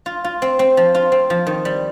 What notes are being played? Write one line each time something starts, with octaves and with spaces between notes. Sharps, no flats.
F4
F4
C4
C4
F3
F4
C4
F3
D#3
G3